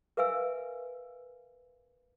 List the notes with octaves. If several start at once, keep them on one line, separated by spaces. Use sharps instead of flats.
A#4 B4 E5 F5 G#5 E6